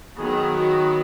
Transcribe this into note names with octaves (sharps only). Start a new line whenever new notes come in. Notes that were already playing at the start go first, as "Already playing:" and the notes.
D#3 F#3 B3 G#4
F#4